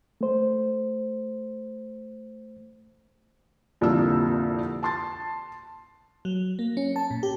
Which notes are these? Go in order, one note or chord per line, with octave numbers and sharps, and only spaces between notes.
A3 C5
C2 F2 A#2 D3 A#3 E6
A5 C6 A6
F#3
A#3
C#4
A5
A#2
G4